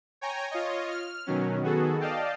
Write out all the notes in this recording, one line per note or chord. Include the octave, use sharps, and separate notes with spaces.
C#5 G5 G#5 A#5
F4 C#5 D#5
F6
B2 D#3 F#3 C#4
D#3 B3 F#4 G#4 A4
D5 D#5 F5 G5 A5